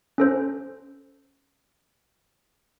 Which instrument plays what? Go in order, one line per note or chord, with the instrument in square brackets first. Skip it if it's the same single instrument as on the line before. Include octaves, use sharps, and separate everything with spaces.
[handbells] C#4 A4 C5